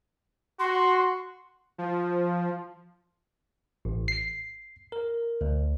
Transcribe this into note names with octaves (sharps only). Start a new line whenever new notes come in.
F#4 C6
F3
A1
C7
A#4
D2